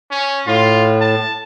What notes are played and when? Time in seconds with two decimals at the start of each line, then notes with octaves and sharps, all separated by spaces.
0.11 C#4
0.47 A2 F4
1.01 A5